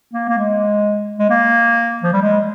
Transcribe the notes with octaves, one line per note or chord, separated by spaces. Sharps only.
A#3
A#3
G#3
G#3
A#3
F3
G3
G#3